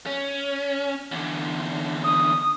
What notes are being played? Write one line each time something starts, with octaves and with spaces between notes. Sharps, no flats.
C#4
E2 D3
D#6